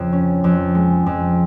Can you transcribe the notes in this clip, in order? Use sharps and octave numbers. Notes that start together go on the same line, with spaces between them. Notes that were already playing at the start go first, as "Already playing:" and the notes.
Already playing: F2 C#3
C#4
F2
G#3
F2